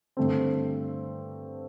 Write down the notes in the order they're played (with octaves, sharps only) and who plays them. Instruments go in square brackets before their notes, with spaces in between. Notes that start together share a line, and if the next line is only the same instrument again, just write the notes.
[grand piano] G2 D3 A3 C4